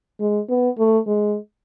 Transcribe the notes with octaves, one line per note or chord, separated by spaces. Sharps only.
G#3
B3
A3
G#3